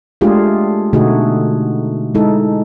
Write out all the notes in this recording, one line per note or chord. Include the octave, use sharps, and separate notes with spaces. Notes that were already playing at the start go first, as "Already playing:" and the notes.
G#3 A3 D4 F4 G4 G#4
B2 D3 A3 D#4 F#4 G#4
G#3 D#4 E4 A4